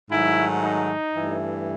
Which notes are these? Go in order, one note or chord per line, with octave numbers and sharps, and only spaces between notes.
G#2 D#3 F#3 A3 E4
D#4
G2 E3 A3